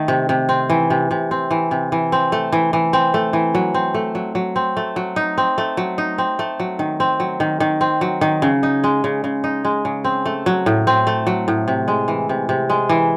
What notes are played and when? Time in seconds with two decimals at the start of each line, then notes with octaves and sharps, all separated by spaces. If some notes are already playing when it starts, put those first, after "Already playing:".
Already playing: D#3 A3
0.08 C3
0.29 C3
0.49 C4
0.70 E3
0.90 C3
1.11 C3
1.31 C4
1.51 E3
1.71 C3
1.92 E3
2.12 C4
2.32 A3
2.52 E3
2.73 E3
2.93 C4
3.14 A3
3.33 E3
3.55 F#3
3.74 C4
3.94 A3
4.15 F#3
4.35 F#3
4.56 C4
4.77 A3
4.96 F#3
5.16 D#4
5.38 C4
5.58 A3
5.77 F#3
5.98 D#4
6.18 C4
6.39 A3
6.60 F#3
6.79 D#3
7.00 C4
7.20 F#3
7.40 D#3
7.60 D#3
7.81 C4
8.01 F#3
8.21 D#3
8.42 C#3
8.63 D#4
8.84 G#3
9.04 C#3
9.24 C#3
9.44 D#4
9.65 G#3
9.85 C#3
10.04 C4
10.26 A3
10.46 F#3
10.66 A2
10.87 C4
11.07 A3
11.27 F#3
11.48 A2
11.68 C3
11.88 G#3
12.08 E3
12.29 C3
12.49 C3
12.70 G#3
12.89 E3